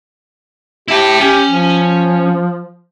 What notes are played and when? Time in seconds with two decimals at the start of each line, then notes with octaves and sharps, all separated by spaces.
0.88 E4 G4 A5
1.21 C#4 G4
1.48 F3